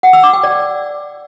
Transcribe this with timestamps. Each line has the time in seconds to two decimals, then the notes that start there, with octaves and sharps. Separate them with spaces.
0.03 F#5
0.13 E6
0.23 D6
0.33 G5
0.43 D5